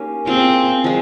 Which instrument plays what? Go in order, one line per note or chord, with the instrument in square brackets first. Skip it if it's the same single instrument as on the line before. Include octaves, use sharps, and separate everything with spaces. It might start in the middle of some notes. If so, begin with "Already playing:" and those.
Already playing: [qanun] A#3 C#4 D#4 G4
[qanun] A#3 F4 G#4 [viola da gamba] C4
[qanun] F3 G#3